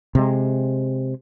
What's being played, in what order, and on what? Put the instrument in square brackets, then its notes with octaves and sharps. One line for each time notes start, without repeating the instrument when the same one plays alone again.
[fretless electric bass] C3 G#3